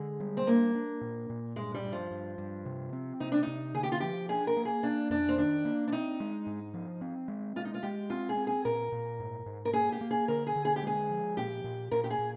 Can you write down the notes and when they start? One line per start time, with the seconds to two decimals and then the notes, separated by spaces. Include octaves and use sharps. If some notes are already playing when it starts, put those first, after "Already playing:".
Already playing: D3 G#3
0.20 G3
0.37 C4
0.47 A#3 D4
0.75 D4
1.01 A#2
1.30 A#2
1.56 G2 G#3
1.74 G3
1.84 G2
1.92 F3
2.11 G2
2.38 G2
2.65 C3
2.93 C4
3.20 C3 D#4
3.32 D4
3.43 C3 D#4
3.74 D3 G#4
3.83 G4
3.92 F4
4.00 F3 G4
4.29 D4 G#4
4.47 A#4
4.57 A#3
4.65 G#4
4.83 A#3 D4
5.10 F2 D4
5.29 C4
5.37 D#3 D4
5.65 A#3
5.88 D4
5.92 C4 D#4
6.20 G#3
6.46 G#2
6.74 F3
7.01 C4
7.28 G#3
7.56 G#3 F4
7.65 D#4
7.74 F4
7.83 G#3 G4
8.10 C4 F4
8.29 G#4
8.37 C4
8.47 G#4
8.65 A#2 A#4
8.92 A#2
9.20 G#2
9.46 G#2
9.65 A#4
9.73 A#3 G#4
9.92 G4
10.01 A#3
10.11 G#4
10.28 D3 A#4
10.47 G#4
10.56 D3
10.65 G#4
10.76 G4
10.83 G#3 G#4
11.10 F3
11.37 A#2 G4
11.64 A#2
11.91 A#2 A#4
12.04 G4
12.10 G#4
12.19 A#2